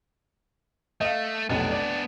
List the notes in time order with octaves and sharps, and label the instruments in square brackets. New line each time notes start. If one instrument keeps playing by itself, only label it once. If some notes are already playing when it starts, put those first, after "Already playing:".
[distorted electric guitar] A3 [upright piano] D#5 F5
[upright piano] F1 B1 [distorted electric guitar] B3 D4
[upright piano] D5